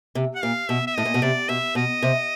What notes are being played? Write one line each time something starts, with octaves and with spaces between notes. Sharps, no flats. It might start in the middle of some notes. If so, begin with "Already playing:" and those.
C3
F#5
A#2 F5
B2 E5
E5
A2 D#5
A#2
B2
C3 D5
B2 E5
B2 D#5
C3